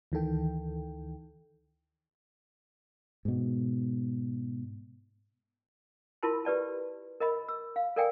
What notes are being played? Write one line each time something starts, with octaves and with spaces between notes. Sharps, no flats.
D2 D#3 E3 A4 G5
G#2 B2
E4 F4 A#4 A5 B5 C6
G4 B4 D5 A5
A#4 D#5 B5
E6
F5
A4 A#4 D5 F5 G5 G#5